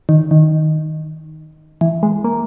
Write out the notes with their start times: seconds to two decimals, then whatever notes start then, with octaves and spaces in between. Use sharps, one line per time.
0.09 D#3
0.31 D#3
1.81 E3
2.03 G#3
2.24 A#3